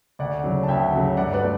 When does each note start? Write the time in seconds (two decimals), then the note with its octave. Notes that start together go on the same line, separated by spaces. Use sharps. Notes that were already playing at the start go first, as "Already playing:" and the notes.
0.19 D2 D5 F#5
0.44 C#3 F#3
0.63 A5
0.68 D2 E5 G5
0.93 C#3 F#3
1.17 G2 D5 F#5
1.33 B4 D5
1.42 A3